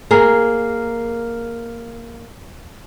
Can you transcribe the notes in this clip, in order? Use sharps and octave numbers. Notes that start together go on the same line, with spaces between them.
A#3 G#4 A#4